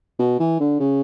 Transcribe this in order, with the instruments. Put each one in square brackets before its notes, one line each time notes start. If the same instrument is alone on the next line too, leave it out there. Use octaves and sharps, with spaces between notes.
[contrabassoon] B2
E3
D3
C#3